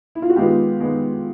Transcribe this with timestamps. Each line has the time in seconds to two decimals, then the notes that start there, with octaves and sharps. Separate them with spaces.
0.15 E4
0.22 F4
0.30 F#4
0.36 D#3 G#3 B3 F4 G4
0.79 D#3 G#3 B3